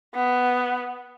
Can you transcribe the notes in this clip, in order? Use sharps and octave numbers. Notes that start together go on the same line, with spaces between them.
B3